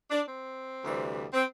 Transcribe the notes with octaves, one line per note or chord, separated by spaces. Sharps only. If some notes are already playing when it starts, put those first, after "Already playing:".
D4
C4
D2 C3 E3 G3
C4